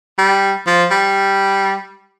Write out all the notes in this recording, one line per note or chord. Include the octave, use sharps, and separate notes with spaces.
G3
F3
G3